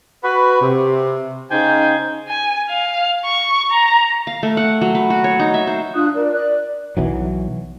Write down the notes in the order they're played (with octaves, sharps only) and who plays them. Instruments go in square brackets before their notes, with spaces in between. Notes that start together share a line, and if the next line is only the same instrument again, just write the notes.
[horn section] F#4 B4
C3
C#3 D#4 C5 G5 G#5
[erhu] G#5
F5
C#6
A#5
[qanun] F5
A3
F#5
F#3
B4
F#4
C#5
D#4
E5
C5
[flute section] D4 F4 D#6 F#6
A#4 D5
D5 F#6
[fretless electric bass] B1 E3 F#3